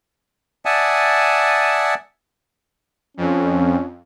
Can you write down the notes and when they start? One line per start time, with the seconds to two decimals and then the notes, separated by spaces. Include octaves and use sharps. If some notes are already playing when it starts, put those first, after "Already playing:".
0.65 D5 E5 F#5 G#5 A5 D#6
3.17 F2 C#4